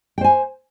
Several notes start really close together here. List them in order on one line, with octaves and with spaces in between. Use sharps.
G5 C5 G#5